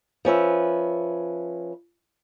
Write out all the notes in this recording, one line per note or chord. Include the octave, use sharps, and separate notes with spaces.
F3 C#4 B4 E5